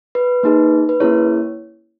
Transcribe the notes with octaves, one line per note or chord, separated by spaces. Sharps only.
B4
A#3 D#4 G#4
B4
A#3 C#4 E4 G#4 C#5